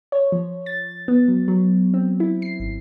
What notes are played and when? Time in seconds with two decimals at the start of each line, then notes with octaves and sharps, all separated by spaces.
0.12 C#5
0.32 F3
0.66 A6
1.08 B3
1.28 F#3
1.48 F#3
1.94 C4
2.20 E4
2.42 C7
2.60 G#1